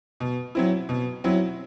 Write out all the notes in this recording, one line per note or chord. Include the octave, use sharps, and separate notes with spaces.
B2
F#3 C4 E4
B2
F#3 C4 E4